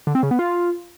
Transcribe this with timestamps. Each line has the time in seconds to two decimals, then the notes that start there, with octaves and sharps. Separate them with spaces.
0.07 D3
0.15 C4
0.23 C#3
0.31 B3
0.39 F4